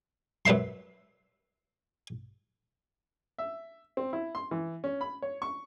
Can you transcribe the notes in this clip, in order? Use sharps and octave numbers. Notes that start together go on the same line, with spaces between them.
F#2 B4 C5 E5 C6
E5
C4
E4
C6
E3
C#4
B5
C#5
C#6